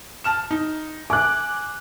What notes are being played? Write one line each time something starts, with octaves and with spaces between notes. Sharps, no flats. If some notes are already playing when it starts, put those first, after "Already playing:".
A5 F6 E7
D#4
G#5 D6 F#6